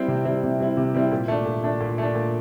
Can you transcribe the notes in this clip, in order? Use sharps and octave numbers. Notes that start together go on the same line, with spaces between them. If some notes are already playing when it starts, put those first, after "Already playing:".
Already playing: G3 C4 E4
C3
G3 C4 E4
C3
G3 C4 E4
C3
G3 C4 E4
A#2
A3 D4
A#2
A3 D4
A#2
A3 D4
A#2